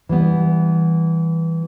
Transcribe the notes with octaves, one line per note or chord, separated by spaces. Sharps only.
E3 G3 B3